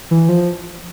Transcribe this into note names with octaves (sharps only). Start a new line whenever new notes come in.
E3
F3